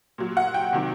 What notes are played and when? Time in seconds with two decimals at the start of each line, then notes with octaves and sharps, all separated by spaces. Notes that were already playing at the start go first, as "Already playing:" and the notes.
0.18 A#2 F#3
0.37 F#5
0.54 G5
0.73 C3 D#3 F#3